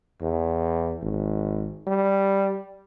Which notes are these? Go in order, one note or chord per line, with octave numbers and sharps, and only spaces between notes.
E2
G#1
G3